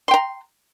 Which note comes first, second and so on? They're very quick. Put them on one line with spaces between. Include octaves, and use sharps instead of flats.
C6 G5 A#5